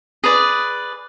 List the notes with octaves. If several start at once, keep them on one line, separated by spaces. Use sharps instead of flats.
G#4 B4 D5